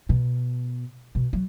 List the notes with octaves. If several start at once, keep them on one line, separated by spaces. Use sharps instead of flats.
B2
B2
F#3